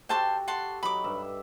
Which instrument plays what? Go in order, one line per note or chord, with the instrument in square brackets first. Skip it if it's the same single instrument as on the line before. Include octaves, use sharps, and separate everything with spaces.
[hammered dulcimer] F#4 G4 A4 [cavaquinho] C5 A5 C6
[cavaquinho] F#5 A5 C6
[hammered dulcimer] F#3 D#4 [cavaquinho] B5 D6
[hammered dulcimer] G2 E5